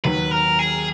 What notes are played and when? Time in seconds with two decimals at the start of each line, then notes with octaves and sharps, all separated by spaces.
0.04 D#2 D#3 F#3 B4
0.31 A#4
0.59 G#4